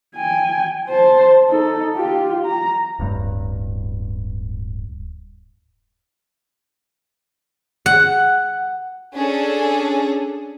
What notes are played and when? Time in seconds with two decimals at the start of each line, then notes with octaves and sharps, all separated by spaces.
0.16 G5 G#5
0.89 C5 A5
1.49 D#4 A4
1.96 F4 G4
2.45 A#5
2.99 D1 G2
7.86 F#5
9.14 C#4 D4 G#4 A4